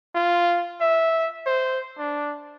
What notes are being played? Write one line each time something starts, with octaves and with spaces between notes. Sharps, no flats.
F4
E5
C5
D4